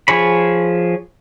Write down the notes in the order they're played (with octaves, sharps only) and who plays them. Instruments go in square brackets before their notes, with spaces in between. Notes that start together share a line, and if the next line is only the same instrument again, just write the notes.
[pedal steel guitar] F3 G#4 C#5 B5